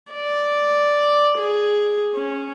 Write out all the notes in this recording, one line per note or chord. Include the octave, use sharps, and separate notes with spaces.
D5
G#4
C#4